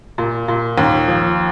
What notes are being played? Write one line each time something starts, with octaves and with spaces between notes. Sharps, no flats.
A#2
A#2
D#2
F3